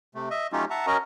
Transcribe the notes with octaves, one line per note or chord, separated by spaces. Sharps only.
C3 A3
D#5 E5
F#3 A3 C#4 D#4 F4 G4
E5 F#5 A5 A#5
C#4 F#4 A#4 D#5 A#5